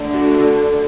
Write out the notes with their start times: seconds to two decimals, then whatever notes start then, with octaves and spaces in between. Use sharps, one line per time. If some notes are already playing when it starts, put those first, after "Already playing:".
Already playing: D3 A3 D4
0.13 F#4